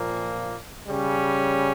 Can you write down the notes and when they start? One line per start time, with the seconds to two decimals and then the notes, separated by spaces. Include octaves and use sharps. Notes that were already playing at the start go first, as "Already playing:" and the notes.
Already playing: A#2 F3 A#3
0.86 C#3 G3 C#4